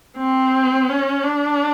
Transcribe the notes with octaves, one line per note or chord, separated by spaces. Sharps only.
C4
C#4
D4